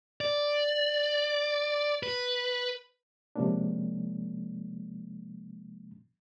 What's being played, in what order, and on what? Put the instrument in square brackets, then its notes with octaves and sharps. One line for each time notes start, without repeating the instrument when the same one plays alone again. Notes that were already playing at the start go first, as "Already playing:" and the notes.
[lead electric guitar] D5
B4
[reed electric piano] C3 F3 G#3 A#3 C#4 D4